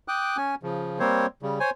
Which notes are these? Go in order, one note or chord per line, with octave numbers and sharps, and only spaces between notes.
G5 D6 D#6 F#6
C#4 G#5
C#3 F3
G3 A#3 C4 C5 C#5
C#3 G3
C5 C#5 G#5